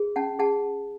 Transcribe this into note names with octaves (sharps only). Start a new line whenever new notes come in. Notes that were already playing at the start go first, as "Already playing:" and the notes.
Already playing: G#4
C#4 F#5 A5
G#4 F#5 A5